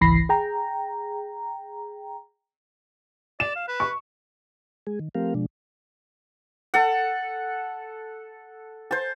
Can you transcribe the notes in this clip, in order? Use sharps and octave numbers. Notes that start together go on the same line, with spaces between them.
G#1 C#2 E3 B5 A#6 C7
G#4 G5 A#5
D5 E7
F5
B4
C#6
G#3 G#4
D#3
F3 A3 C4 G4 A#4 F5
B2 F3 G#3 D4
A4 F#5
C5 A5